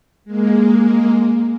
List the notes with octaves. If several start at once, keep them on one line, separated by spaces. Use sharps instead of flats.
G#3 A#3